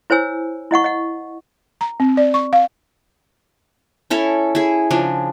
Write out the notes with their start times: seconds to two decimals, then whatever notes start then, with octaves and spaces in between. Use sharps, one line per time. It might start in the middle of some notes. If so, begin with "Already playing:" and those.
0.10 E4 C5 C#5 G#5 E6
0.71 E4 D#5 F#5 C#6
0.84 D#5 F#5
1.81 A#5
2.00 C4
2.17 D5
2.34 C#6
2.53 F5
4.10 C#4 E4 A4 C#5
4.55 E4 G#4
4.91 C#3 F3 D4